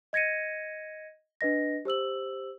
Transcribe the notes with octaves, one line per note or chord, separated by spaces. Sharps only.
D#5 G#6 A#6 C#7 D#7
D4 B4 D#5 A#6
G4 C5 E6 F#7